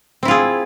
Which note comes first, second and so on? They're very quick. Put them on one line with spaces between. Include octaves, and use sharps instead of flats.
C4 E4 F4 G#4